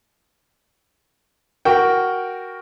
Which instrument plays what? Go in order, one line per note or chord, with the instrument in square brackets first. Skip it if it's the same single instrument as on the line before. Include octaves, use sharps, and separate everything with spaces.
[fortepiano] F#4 A#4 G5